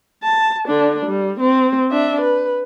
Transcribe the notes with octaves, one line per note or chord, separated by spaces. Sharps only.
A5
D3 D4
G3
C4
D4 E5
B4